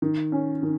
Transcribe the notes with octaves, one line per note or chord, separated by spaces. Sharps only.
D#3
C#4
D#3